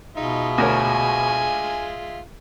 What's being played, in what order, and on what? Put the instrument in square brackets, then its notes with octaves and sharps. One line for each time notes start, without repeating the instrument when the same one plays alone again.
[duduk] B2 [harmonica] G#3 F4 E5 [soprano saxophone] D#4
[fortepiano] D2 A#4 C#5 [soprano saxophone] G#5